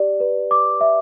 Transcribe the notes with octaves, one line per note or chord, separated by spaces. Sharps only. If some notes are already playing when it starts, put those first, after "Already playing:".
Already playing: G4 D5
B4
D6
E5